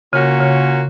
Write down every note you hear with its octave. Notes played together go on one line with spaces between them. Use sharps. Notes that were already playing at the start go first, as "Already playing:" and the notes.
A#2 C#3 A#3 C#4 F#4
C#3